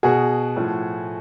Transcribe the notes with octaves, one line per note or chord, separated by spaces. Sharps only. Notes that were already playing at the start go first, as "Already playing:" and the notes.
B2 F#4 G#4
A2 F3